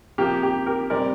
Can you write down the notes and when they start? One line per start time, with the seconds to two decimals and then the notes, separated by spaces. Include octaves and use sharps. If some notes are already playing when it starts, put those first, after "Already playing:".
0.18 C3 F3 A#3 G4
0.43 G4
0.66 G4 A#4
0.90 C3 G3 C4 A#4 D5